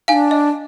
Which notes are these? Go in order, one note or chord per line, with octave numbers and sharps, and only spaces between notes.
D#4 F5 G#5
D4
D#5